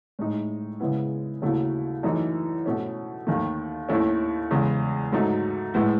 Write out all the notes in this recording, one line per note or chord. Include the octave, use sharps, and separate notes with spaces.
A2 G#3 D#4
C#3 G#3 B3 E4
D#2 C#3 F#3 A3 E4
F#2 E3 A3 D#4
B2 A3 C#4
D#2 D#3 A3
D#2 D#3 A3 C#4 E4
E2 C#3 G#3
G#2 F#3 A3 D#4
A2 G#3 B3 E4